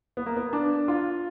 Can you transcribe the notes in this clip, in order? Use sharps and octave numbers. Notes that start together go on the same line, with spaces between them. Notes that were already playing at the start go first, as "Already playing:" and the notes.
B3
A#3
B3
D4
F4